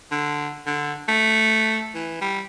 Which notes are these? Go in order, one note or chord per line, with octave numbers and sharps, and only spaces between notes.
D3
D3
A3
E3
G3